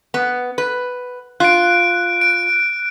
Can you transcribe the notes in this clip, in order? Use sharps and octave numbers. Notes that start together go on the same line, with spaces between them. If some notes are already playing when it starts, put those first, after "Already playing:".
B3
B4
F4 F#6 D7
D7